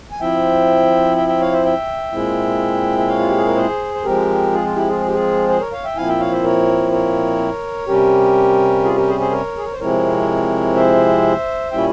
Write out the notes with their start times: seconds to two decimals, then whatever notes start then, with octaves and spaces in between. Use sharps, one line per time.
0.12 G#5
0.20 F3 C4 E4 E5 G5
1.17 E5 G5
1.28 E5 G5
1.41 C#5 F5
1.52 C5 E5
1.65 E5 G5
2.12 A#2 G#3 C4 E4
2.98 E5
3.08 C#5 F5
3.19 F4
3.28 G4
3.37 G#4
3.47 A#4
3.56 G#4 C5
3.94 C5
4.04 F3 G#3 C4 G4 A#4
4.52 F4 G#4
4.65 F4
4.76 E4 G4
4.88 F4 G#4
5.00 G#4
5.07 G4
5.14 F4 G#4
5.48 G#4 C5
5.60 A#4 C#5
5.72 C#5 F5
5.84 E5 G5
5.96 A#2 F3 C4 E4 F5 G#5
6.08 E5 G5
6.20 C#5 F5
6.32 C5 E5
6.44 A#4 C#5
6.92 A#4 C#5
7.87 C3 G3 C#4 G4 A#4
8.83 F4 G#4
8.96 G4 A#4
9.08 G#4 C5
9.20 G#4 C5
9.31 A#4 C#5
9.57 G#4
9.65 A#4
9.73 C5
9.79 C3 F3 G#3 C4 E4 A#4 C#5
10.76 C5 E5
11.72 A#2 G3 C#4 E4 E5 G5